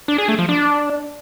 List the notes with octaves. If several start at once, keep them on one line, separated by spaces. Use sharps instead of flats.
D4
G#4
A3
F3
D4